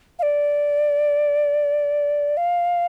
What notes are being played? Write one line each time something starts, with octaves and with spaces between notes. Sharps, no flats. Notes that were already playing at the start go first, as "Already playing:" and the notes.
F5
D5
F5